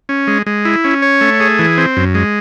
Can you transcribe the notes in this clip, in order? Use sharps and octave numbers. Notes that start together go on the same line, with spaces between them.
C#4
G#3
G#3
E4
C#4
C#5
A3
G#4
E3
C4
F#2
G#3